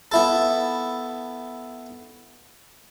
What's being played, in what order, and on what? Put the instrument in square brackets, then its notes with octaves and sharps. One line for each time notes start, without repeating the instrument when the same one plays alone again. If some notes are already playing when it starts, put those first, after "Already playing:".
[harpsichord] B3 E4 A4